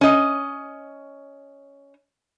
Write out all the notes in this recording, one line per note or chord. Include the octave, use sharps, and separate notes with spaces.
C#4 D#5